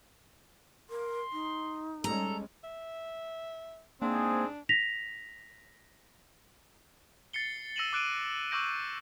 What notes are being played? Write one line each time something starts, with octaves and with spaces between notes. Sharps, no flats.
A#4 C6
D#4
G3 G#3 C#4 A4 A#5
E5
G#2 A#3 C4 D4 G#4
A#6 B6 F7
A6 C7 C#7 G7
E6 A#6 C#7 D#7 E7 F#7
D6 F#6 D7 D#7
C#6 D6 E6 G6 A#6 D7